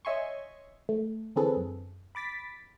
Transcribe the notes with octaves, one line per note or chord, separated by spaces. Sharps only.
C#5 D#5 E5 G#5 C6 C#6
A3
D3 E3 C4 G#4 A4 B4
F#2
B5 D6 A6 B6